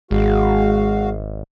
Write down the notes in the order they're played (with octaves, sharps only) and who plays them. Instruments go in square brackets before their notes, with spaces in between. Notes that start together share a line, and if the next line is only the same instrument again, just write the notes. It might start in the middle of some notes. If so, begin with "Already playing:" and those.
[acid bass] G#1 [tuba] G#3 [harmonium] F#4 F5